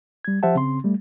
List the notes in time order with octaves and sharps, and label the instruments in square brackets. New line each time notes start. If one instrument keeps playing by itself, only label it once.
[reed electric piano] G3 G#6
F3 G4 C5 E5 F#5 A5
C#3 C4 C6
G3 A3